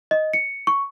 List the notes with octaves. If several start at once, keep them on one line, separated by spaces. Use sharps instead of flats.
D#5
C#7
C#6